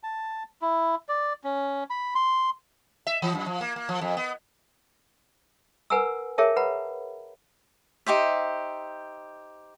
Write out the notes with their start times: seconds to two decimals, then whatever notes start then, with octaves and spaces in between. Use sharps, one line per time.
0.03 A5
0.62 E4
1.09 D5
1.44 C#4
1.90 B5
2.15 C6
3.07 E5
3.22 E3
3.35 F#2
3.46 F3
3.61 A#3
3.76 A#3
3.89 F3
4.01 F2
4.17 B3
5.90 A#4 B4 F#5 G#5 A#5 E6
6.38 G#4 A#4 C#5 E5 G5 A5
6.56 B4 F#5 A#5 B5
8.06 D#4 G4 C5 E5